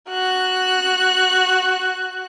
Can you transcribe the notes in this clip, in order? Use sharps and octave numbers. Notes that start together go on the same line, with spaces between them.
F#4 F#6